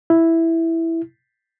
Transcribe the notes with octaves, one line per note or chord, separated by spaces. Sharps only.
E4